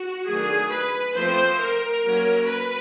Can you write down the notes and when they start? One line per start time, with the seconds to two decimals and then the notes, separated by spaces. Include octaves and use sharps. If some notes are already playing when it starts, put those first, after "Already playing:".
Already playing: F#4
0.27 D#3 F#3 A3 D4 G#4
0.72 B4
1.15 F3 A3 C4 C5
1.60 A#4
2.04 F#3 A#3 C#4
2.48 B4